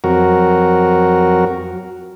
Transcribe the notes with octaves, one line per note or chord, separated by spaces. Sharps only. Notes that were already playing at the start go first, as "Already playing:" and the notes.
F2 F#3 F#4 A#4